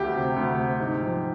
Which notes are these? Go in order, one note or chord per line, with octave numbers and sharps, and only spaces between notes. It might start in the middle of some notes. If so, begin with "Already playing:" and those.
Already playing: D2 G4
C3
D2
C3
G#2
F3